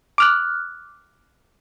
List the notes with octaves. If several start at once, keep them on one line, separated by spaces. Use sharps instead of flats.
D6 F6 F#6